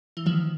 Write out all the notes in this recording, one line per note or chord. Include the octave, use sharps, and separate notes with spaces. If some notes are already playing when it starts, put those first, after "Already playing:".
E3
D#3 F3